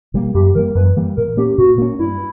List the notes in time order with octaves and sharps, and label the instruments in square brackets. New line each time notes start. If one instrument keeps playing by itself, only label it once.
[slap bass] B2 G3 A#3
[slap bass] F#2 [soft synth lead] G4
[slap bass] E3 G3 A#3 [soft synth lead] A#4
[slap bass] F#2 [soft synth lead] B4
[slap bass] E3 G3 A#3
[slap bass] A#2 [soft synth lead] A#4
[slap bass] A#3 C#4 [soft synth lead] G4
[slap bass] A#2 [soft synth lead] F#4
[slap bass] A#3 C#4
[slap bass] G2 [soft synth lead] E4